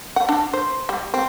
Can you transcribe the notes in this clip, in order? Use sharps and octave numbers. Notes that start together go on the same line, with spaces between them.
F#5
D4
C5
G3
C4